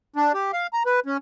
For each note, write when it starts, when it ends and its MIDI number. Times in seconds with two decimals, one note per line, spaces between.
0.16 0.33 62
0.34 0.51 67
0.53 0.67 77
0.73 0.83 82
0.86 1.00 71
1.06 1.17 61